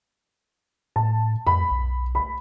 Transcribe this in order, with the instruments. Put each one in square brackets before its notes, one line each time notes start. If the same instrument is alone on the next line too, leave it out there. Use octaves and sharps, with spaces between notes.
[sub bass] A2 [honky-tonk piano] A5
[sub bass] F2 [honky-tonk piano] B5
[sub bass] B1
[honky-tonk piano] B5